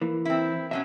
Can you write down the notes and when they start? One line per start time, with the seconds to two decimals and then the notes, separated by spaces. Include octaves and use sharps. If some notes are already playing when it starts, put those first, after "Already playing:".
0.01 E3 A#3
0.25 C4 E4
0.71 B2 F#3 C#4 E5